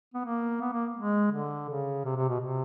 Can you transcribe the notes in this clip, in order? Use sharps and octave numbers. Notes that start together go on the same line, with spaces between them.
B3
A#3
B3
A#3
G#3
D3
C#3
C3
C3
B2
C3